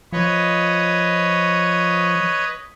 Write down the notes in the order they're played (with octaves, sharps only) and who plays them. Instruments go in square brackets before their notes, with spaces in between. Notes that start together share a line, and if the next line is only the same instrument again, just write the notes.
[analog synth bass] F3 [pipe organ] B4 C#5 D#5